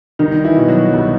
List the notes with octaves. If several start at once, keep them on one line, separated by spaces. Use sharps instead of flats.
C2 D#3 D#4
E3 E4
B2
F#3 F#4
C2